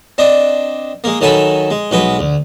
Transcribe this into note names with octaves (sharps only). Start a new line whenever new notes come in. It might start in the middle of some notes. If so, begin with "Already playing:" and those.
C4 D4 D#5
G#3 A#3
D#3 F#3 A4 G#5 B5
G#3
B1 G#3 F#4 B4
D2